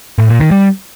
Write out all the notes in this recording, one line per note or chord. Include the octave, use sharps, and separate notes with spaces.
A2
A#2
D#3
G3